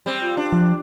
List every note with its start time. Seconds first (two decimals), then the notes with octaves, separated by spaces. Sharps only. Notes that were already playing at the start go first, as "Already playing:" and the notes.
0.06 G3 C4
0.22 F4
0.37 D4
0.53 F3